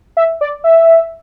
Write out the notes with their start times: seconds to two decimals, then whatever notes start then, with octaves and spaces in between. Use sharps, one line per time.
0.17 E5
0.41 D5
0.64 E5